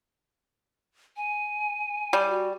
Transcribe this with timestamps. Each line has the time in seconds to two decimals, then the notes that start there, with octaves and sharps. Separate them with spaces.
1.16 G#5
2.13 G3
2.30 F#4